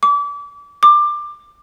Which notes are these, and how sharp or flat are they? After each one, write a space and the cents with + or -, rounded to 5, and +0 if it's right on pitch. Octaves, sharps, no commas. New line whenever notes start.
D6 -35
D6 +20